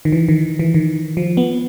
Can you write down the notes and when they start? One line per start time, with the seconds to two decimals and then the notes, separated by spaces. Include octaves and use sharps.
0.05 D#3
0.12 E3
0.29 D#3
0.59 E3
0.74 D#3
1.17 F3
1.37 B3